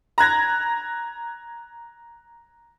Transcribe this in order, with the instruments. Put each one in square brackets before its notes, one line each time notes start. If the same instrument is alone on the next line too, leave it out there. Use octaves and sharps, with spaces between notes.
[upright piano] A#5 F#6 G#6 A#6